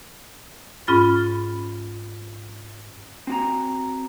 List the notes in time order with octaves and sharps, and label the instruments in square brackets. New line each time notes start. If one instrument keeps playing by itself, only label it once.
[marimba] G#2 C#4 F4 B5 A6
[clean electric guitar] C4 F#4 A#5